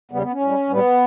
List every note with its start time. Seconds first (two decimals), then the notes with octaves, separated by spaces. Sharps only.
0.11 E2 C#3 G3 B3
0.22 B3
0.32 C#4
0.40 A2 G3
0.69 A2 G3 B3